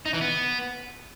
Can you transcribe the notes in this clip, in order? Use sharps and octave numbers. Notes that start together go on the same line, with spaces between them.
D#4
E3
B3